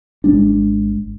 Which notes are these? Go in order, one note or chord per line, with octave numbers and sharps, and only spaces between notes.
G#1 G#3 D4